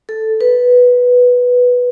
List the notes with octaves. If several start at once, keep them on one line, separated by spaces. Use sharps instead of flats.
A4
B4